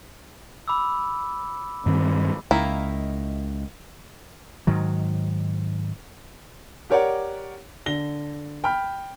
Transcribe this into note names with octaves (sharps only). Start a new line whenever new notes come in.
B5 D6 E6
G2 D#3 C4
C#2 D#3 A#3 E4
G#2 D#3 F#3
G4 A#4 C#5 D5 F#5
D3 A#6 G7
G5 B5 F6